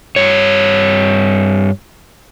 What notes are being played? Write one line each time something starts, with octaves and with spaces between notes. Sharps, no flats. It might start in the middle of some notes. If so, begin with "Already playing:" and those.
G2 C#5